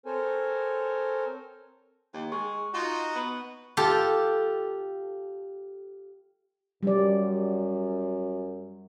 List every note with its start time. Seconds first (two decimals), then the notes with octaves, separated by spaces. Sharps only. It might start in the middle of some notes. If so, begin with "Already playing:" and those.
0.06 C4 A4 A#4 C5 C#5 G#5
2.14 D#2
2.32 G#3 C#6
2.74 D#4 F4 F#4
3.16 B3
3.77 F4 G4 A4
6.83 F#2 G3 D5